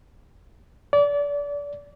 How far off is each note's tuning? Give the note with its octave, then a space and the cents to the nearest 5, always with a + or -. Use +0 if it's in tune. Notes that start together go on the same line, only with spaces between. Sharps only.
D5 -30